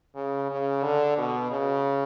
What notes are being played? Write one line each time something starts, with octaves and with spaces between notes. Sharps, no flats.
C#3
C#3
D3
B2
C#3